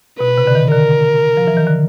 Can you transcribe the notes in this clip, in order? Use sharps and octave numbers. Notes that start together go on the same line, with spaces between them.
B2 B4
C3
D3
D#3
D3 A#4
F3
E3
D#3
D3